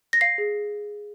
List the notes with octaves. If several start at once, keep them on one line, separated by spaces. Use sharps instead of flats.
A#6
F5 C7
G#4